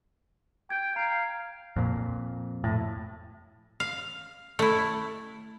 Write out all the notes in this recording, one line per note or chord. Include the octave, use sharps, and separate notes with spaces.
G5 G#6
F5 A#5 G#6
F2 A#2
A2
F5
A3 E4